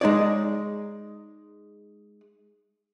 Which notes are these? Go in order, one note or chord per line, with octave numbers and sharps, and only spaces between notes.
G#3 D#4 C#5 D5